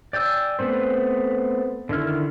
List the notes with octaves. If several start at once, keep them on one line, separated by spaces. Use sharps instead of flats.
D5 G5 G#5 E6
A3 B3 C4 C5
D3 D#3 E4 F6